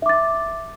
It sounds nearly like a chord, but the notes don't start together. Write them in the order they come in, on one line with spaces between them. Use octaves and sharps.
E5 D6 A6